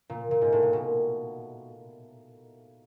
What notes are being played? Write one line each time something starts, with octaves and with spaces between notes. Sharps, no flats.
A#2
A#2
G#2
A2
A#2
B2